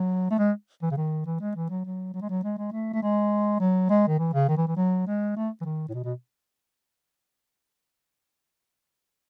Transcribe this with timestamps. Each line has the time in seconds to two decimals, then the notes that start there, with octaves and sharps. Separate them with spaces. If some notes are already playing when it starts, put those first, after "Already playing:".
Already playing: F#3
0.31 A3
0.39 G#3
0.82 E3
0.91 C#3
0.97 D#3
1.26 E3
1.40 G#3
1.56 E3
1.70 F#3
1.85 F#3
2.14 F#3
2.22 G#3
2.29 F#3
2.44 G#3
2.58 G#3
2.72 A3
2.93 A3
3.02 G#3
3.60 F#3
3.90 G#3
4.07 D#3
4.19 E3
4.34 C#3
4.49 D#3
4.57 E3
4.68 E3
4.77 F#3
5.07 G#3
5.36 A3
5.61 E3
5.65 D#3
5.88 A2
5.94 B2
6.04 B2